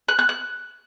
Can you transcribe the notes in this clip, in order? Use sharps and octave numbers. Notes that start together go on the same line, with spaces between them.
F#6
F#6
F#6